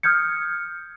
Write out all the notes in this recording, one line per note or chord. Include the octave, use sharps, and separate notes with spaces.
D#6 F6 G6 G#6 C#7